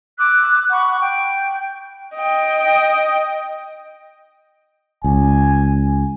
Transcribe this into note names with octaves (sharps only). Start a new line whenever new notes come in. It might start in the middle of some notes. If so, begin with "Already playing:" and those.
D6 E6 F#6
F#5 B5 C#6
G5
D#5 G5
C#2 G#5